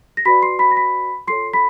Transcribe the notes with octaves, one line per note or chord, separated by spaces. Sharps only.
A#6
F#4 B4 D5 B5 B6
C6 C7
B5 B6
A#6
B5 B6
F4 A4 C#5 C6 C7
B5 B6